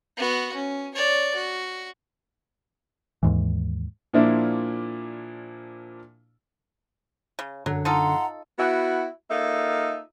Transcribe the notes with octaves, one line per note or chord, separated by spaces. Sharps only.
B3 F#4
C#4
C#5 D5
F#4
D#2 G#2 E3
A#2 F3 A#3 D4 E4 F4
C#3
F#2 D3 F#3
D#4 F4 A4 F#5 A#5 C6
B3 E4 F#4
A#3 D#4 F4 A4 E5